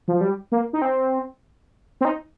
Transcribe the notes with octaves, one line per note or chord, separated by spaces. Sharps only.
F3
G3
A#3
D#4
C4
C4
D#4